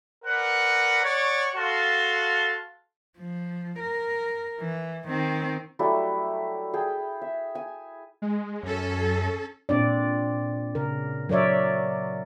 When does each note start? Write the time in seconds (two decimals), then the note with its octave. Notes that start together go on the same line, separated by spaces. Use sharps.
0.25 A#4 B4 D5 F#5
1.04 C#5 D5 F#5 C#6
1.56 F#4 A4 F5 A5 C6
3.18 F3
3.79 A#4
4.60 E3
5.08 D#3 C4
5.79 F#3 G3 A3 E4
6.74 G#4 G5 A5
7.22 E5
7.55 G#5
8.22 G#3
8.63 F#2 C#4 A4
9.69 A#2 C4 D4 D5
10.75 C#3 A#4
11.29 F#3 A#4 C#5 D5 E5